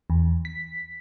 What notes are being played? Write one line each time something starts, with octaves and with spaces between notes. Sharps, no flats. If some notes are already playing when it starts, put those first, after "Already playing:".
E2
B6